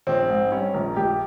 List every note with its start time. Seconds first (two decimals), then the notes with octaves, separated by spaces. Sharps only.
0.07 A#1 C4
0.29 G#2
0.52 G3 C#4
0.74 A#1 A#4
0.96 A#1 G4